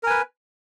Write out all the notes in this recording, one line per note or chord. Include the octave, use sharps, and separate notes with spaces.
A#4 B4 G#5